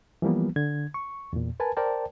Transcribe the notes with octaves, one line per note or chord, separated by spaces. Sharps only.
E3 F3 G3 A#3 B3
D3 G#6
C#6
E2 A#2
A#4 B4 G#5 A5
A#4 C5 D5 G5 A5